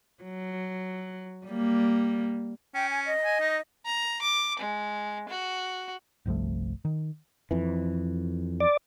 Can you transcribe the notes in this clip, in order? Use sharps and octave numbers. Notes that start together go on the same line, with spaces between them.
F#3
G3 A#3
C#4 G5
G#5
D#5
G#5
D#4
A#5
D6
G#3
F#4
G1 C2 F3 A3
D#3
F2 E3
D5